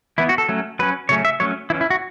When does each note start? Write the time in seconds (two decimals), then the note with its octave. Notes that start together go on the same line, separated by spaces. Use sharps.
0.18 E3 B3 E4
0.29 F#4
0.38 A4
0.49 F#3 A3 C#4
0.79 F#3 C#4 B4
1.09 C#3 F#3 A3 C#4 C#5
1.25 E5
1.40 F#3 A3 C#4 C#5
1.70 E3 C#4 E4
1.81 E4
1.90 F#4